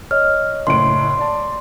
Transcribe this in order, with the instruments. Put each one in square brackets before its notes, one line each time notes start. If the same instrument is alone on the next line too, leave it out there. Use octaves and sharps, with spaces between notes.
[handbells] C#5 D#5 [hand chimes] F6
[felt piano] F#1 A2 D7 [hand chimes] C6
[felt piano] D5 A5